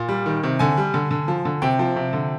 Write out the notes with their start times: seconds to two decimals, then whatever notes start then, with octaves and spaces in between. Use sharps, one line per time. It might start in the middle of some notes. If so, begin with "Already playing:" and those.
Already playing: A#2
0.09 G3
0.26 D#3
0.43 C3
0.59 D3 G#5
0.77 G3
0.94 D3
1.11 D3
1.28 F3
1.45 D3
1.62 C3 G5
1.79 F3
1.96 C3
2.13 D3